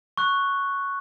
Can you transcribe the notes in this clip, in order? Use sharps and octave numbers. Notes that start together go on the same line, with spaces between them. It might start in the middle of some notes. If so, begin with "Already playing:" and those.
C#6 F#6